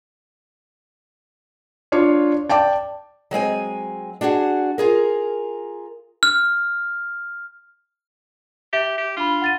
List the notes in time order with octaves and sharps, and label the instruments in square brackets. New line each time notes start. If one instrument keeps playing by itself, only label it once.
[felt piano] D4 F4 C#5
D5 G5 A5 D6
[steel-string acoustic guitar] F#3 G#3 C4 G#5
D4 F#4 G#4 F#5
F4 G#4 A#4
[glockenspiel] F6
[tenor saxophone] G4 [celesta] E5
[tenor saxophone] G4
[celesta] D4 B5 [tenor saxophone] F4
[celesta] F#5 A6 D#7